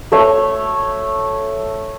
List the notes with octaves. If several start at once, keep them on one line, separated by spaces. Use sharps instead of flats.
A3 C#5